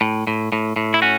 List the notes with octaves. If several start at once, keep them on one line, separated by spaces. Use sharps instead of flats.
A2
A2
A2
A2
E4
C#4 F#4